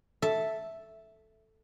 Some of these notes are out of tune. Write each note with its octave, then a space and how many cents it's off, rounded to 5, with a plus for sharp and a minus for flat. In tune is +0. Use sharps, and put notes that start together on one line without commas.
A4 +0 E5 +0